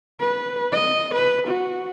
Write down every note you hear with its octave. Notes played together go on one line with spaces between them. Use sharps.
B4
D#5
B4
F#4